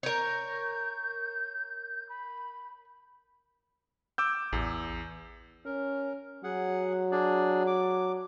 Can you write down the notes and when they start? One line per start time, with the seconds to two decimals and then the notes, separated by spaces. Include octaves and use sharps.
0.03 A#4 C#5 G6
2.08 B5
4.18 D6 E6 G6
4.53 A1 E2
5.65 C#4 A#4
6.44 F#3 G#4 F#5
7.11 D4 G#4 D5
7.67 D6